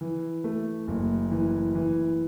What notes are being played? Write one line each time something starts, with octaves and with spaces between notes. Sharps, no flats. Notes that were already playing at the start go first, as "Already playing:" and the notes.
E3
A3
F#1
E3
E3